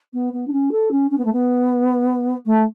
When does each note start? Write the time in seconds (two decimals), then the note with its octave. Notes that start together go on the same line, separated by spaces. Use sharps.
0.13 B3
0.33 B3
0.47 D4
0.52 C#4
0.72 A4
0.91 C#4
1.10 C#4
1.18 B3
1.25 A3
1.32 B3
2.45 A3